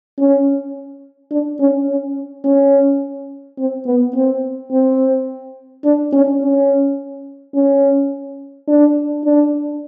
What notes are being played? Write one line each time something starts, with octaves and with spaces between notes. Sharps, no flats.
C#4
D4
C#4
C#4
C#4
C4
B3
C4
C4
D4
C#4
C#4
C#4
D4
D4